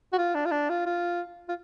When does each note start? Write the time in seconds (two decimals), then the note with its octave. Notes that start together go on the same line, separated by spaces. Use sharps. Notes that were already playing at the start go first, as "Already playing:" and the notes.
0.13 F#4
0.18 F4
0.35 D4
0.46 F4
0.51 D4
0.69 F4
0.86 F4
1.49 F4